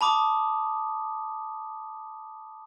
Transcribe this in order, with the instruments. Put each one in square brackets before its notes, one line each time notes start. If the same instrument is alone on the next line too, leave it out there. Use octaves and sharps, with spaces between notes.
[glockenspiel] A5 B5 D6 D#6